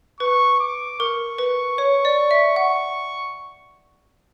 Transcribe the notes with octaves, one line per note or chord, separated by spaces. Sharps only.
B4 C#6
D6
A#4 C#6
B4
C#5
D5
E5
F#5 C#6